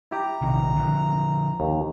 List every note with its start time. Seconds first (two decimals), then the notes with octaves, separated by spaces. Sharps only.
0.11 E4 G4 A#5
0.42 A#1 C3 D#3
0.76 D3 F3
1.60 D#2